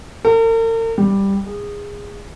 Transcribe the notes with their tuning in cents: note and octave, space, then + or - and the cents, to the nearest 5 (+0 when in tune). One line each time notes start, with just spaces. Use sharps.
A#4 -45
G3 +5
G#4 -20